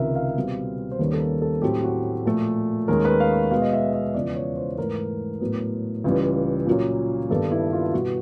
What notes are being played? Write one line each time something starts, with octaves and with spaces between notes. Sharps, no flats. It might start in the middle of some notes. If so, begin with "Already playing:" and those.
Already playing: C#2 C3 D#3 A#4 E5
F5
B2 G3 C4
C5
D#2 D#3 G3 A#3 C#4 B4
A4
A#4
A4
A2 F#3 A3 C4 G4
F#4
A#2 F3 A3
D#2 D#3 G#3 C#4 A#4
B4
F5
B2 G#3 B3 F5
D#5
E5
E5
E2 C#3 F3 D5
C#5
C5
G#2 E3 A3 A#4
A2 F#3 B3
C#2 C#3 E3 G3
A#2 F#3 A#3 C#4
G2 D#3 G3 B3 A4
E4
F4
B2 G3 B3 F#4